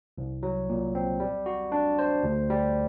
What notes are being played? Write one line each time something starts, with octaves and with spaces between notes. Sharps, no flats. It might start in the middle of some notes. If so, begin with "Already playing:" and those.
C2
F#3
A#2
C4
G3
F#4
D4
C5
D2
G3